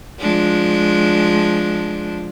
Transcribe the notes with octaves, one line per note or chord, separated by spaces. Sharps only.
F3 G#3 D4